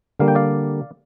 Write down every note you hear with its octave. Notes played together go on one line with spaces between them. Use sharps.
D3 G3 A#3 F5
G5
D5 F5